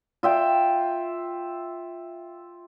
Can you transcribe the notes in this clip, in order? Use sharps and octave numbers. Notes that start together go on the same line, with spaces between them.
F4 E5 G5